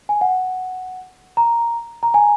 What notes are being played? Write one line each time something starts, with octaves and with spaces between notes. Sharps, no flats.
G#5
F#5
A#5
A#5
G#5